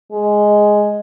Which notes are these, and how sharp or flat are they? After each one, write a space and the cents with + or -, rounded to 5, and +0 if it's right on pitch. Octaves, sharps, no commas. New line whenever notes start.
G#3 +0